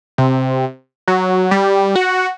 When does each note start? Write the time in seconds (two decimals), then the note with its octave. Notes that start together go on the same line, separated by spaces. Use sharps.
0.18 C3
1.08 F#3
1.51 G3
1.95 F#4